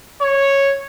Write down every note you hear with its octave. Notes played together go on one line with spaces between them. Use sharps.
C#5